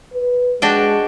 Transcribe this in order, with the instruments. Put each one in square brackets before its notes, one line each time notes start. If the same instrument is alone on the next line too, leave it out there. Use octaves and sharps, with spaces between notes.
[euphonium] B4
[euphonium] G#3 [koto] D4 F#4 G5